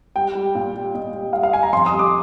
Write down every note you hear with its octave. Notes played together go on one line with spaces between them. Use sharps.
G3 G5
G3
A#2
G3
A#2 D#5
G3
G3 F5
F5
G3 G#5
A#5
F2 C6
D#6
G3
D6